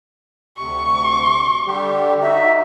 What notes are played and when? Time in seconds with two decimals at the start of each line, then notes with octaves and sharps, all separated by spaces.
0.58 D2 C3 C#6
1.67 D3 G3 G4
2.22 D#4 F#4 E5